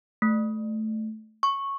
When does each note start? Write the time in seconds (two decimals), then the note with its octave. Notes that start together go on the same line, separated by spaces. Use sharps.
0.22 A3
1.43 C#6